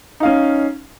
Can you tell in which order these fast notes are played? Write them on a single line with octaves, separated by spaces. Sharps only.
D#4 F5 C#4